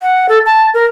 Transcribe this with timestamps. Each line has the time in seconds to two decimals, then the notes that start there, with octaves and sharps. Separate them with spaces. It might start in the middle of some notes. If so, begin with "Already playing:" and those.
0.02 F#5
0.29 A4
0.45 A5
0.74 A#4